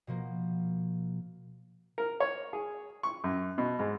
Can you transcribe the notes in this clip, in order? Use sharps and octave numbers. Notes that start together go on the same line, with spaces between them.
B2 F3 A#3
A#4
C#5
G#4
C#6
F#2
B2
G#2